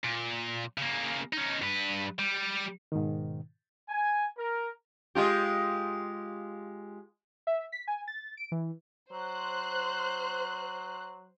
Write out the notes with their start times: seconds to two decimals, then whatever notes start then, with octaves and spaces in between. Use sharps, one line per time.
0.04 A#2
0.78 C#3 A#3
1.33 C#4 D#4
1.62 G2 B4
2.19 G3
2.92 G#2 B2 D#3
3.89 G#5
4.38 A#4
5.15 G#3 F4 G4
7.47 E5
7.72 B6
7.87 G#5
8.08 A6
8.37 D7
8.52 E3
9.12 F#3 C5 F#6